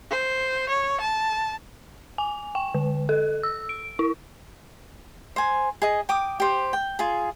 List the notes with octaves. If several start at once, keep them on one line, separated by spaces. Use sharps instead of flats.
C5
C#5
A5
G#5
G5
D3
A4
E6
D7
E4
C5 G#5
G#4 D#5
G5 D6 D#6
G4 C5
G5
F4 G#4